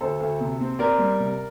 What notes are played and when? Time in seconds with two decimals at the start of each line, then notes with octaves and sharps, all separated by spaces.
0.01 D2 A4 C5
0.20 D2
0.40 C3
0.61 C4
0.79 C4 A#4 D5
0.99 G3
1.20 C3